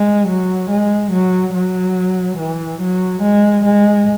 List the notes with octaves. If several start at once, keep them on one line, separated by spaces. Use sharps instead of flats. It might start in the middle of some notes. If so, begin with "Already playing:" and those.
Already playing: G#3
F#3
G#3
F#3
F#3
E3
F#3
G#3
G#3